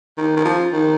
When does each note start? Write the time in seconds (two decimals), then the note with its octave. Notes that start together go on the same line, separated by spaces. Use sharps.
0.17 D#3
0.36 D#3
0.45 F3
0.72 D#3